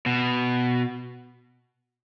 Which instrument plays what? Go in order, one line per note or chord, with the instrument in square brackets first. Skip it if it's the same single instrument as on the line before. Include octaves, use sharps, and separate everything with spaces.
[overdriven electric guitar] B2